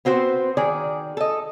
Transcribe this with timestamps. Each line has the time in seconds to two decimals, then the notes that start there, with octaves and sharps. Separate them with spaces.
0.05 B3 C4 F#4 C5
0.57 D#3 G#4 D5
1.17 A4 D#5